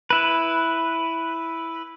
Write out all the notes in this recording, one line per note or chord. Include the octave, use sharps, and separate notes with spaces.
E4 B4